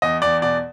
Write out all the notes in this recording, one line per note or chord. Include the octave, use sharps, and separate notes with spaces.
E2 D#5
E2 D5
B2 D5